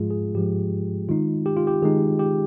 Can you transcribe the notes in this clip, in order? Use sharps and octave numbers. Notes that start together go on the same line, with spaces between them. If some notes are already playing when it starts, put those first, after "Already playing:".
Already playing: G#2 F3 G#3 F4 G#4
G#4
G#2 F3 G#3 G4
D#3 G#3 D#4 F4
G4
F4
G4
D#3 G#3 D#4 G#4
G4